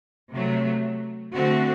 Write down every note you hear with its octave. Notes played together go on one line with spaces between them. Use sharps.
C3 F#3 A3
D3 A3 C4 F#4